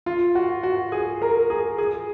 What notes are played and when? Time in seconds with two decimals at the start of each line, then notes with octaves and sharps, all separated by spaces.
0.06 F4
0.35 F#4
0.63 F#4
0.92 G#4
1.22 A#4
1.50 G#4
1.78 G#4